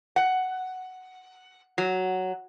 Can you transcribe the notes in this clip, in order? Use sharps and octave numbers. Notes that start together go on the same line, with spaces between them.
F#5
F#3